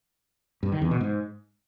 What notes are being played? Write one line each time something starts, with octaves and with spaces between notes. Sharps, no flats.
G2
D#3
E2
B2
G#2